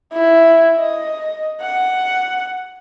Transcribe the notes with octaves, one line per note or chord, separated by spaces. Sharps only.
E4
D#5
F#5